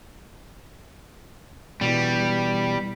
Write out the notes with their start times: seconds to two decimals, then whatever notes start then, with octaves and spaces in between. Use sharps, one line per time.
1.81 B2 E3 G3